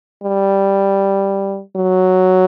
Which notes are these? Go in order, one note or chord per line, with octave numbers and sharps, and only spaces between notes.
G3
F#3